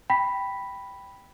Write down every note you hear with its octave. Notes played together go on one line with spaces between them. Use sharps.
G5 B5 A#6 B6